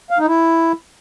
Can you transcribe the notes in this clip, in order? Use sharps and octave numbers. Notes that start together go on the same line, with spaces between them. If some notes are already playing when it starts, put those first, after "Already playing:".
F5
D#4
E4